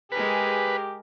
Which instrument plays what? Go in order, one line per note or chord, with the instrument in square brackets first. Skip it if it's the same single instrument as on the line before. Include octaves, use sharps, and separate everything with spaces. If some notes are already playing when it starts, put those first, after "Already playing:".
[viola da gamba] G#3 G#4 A#4 [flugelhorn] G4 [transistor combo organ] B4